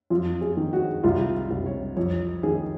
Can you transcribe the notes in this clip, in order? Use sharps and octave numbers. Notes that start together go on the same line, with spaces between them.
F2 F4
G#4
D#3
F#4
C2 F4
C2
C#5
F2 C#5
D#3 G#4